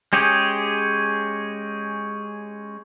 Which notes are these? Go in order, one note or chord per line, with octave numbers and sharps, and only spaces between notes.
G#3 C#4 G4 G#4